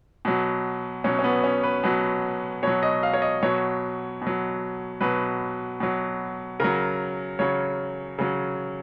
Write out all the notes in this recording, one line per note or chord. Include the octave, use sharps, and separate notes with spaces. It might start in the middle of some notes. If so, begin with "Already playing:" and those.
B2 F#3
B2 F#3 C#4
C#4
B3
C#4
B4
B2 F#3
B2 F#3 C#5
D#5
F5
C#5
D#5
B2 F#3 C#5
B2
F#3
B2 F#3 B4
B2 F#3
C#3 F#3 A#4
C#3 F#3 C#5
C#3 F#3